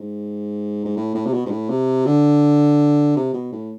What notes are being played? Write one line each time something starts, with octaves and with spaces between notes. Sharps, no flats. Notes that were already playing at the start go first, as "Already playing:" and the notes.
Already playing: G#2
G#2
A2
A2
C3
B2
G#2
A2
C3
D3
C3
B2
A2